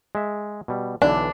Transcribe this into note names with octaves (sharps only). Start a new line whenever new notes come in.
G#3 E5
B2 G3
B1 D3 E3 D4